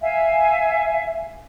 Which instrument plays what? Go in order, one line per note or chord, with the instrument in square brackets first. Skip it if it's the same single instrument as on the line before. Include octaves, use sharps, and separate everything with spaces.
[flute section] E5 F5 G#5